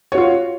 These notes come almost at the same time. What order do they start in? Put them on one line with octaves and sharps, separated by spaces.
C#5 F#4 F4